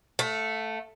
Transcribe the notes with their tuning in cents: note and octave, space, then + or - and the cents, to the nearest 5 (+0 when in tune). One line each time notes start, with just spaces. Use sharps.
A3 +0 F5 +40